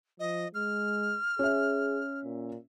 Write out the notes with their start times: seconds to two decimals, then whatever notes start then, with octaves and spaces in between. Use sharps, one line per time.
0.20 F3 D#5
0.55 G#3 F6
1.39 C#4 G#4 E5
2.24 A#2